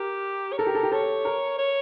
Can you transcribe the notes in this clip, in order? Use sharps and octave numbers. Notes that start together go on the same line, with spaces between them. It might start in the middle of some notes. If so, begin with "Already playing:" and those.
Already playing: G4 A#4
C#5
A4 A#4
G4
A4
G4
A4 C#5
A#4
C#5